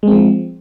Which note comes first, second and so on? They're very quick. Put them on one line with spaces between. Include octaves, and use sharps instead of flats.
G#3 C4 F3